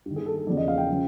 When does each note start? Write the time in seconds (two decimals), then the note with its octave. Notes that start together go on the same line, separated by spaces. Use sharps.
0.06 G2 D#3
0.16 G#4
0.26 A4
0.37 A4
0.47 E2 C#3 F3 D5
0.57 D#5
0.68 F5
0.78 G5
0.90 C#3 F3